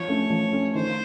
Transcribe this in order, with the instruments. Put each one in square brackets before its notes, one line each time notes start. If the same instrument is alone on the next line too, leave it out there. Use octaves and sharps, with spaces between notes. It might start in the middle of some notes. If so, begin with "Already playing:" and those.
Already playing: [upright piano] F3 [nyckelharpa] C#5
[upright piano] A3 C#4
F3
A3 C#4
[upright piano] D#3 [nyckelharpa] C5